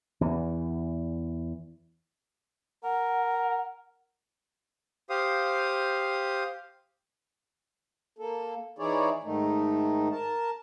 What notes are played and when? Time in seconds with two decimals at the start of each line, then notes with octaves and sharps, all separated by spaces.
0.21 E2 E3
2.84 A#4 F#5
5.10 G4 C5 F5 D#6
8.18 A#3 A4
8.79 E3 D#4 E4 G#4 C#5 D5
9.23 G#2 D#3 A3 D#4
10.12 A#4 A5